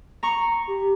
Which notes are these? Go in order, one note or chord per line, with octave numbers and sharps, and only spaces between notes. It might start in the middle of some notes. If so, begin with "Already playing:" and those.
A#5 C#6
G4